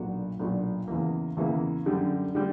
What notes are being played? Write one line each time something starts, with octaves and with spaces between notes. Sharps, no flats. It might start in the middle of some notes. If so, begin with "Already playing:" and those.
Already playing: B1 A#2 A#3 D4 F#4
B1 A#2 A#3 D4 F#4
E2 C#3 E3 A#3
E2 C#3 E3 A#3
F#2 D3 G3
D3 G3